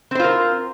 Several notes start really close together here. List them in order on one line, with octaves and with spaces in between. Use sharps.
C4 C5 F4 A#4